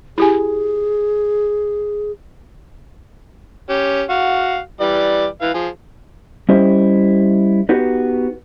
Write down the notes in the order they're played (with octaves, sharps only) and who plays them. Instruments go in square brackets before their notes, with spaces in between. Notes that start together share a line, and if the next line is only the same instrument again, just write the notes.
[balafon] E4 G4 G#5 [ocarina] G#4
[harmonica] C#4 G4
F#4 F5
E3 G3 D5
E3 F5
F3 G#4
[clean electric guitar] G3 C#4 E4 G4 C5 D#5
B3 D#4 F#4 G4 B4